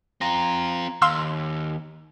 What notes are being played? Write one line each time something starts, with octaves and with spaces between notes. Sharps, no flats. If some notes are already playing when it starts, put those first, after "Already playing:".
C4 F4 A#5
D#2 F5 C6 E6